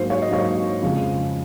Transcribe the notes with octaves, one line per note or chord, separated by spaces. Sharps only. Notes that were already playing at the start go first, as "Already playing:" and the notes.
Already playing: G#2 F#3 A#3 C5
C#5
D#5
G#2 F#3 A#3 C#5
F2 C#3 F3 G#3